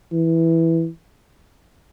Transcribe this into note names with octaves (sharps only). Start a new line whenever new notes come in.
E3